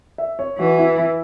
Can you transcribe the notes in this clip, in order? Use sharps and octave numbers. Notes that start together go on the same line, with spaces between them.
E5
C#5
E3 F#4
E4
E4